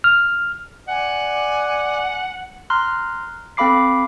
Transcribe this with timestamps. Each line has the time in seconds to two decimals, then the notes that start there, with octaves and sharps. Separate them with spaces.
0.04 F6
0.88 D5 F#5 G#5
2.70 A#5 C6 F6 F#6
3.57 C4 A4 F5 B5 D6 C7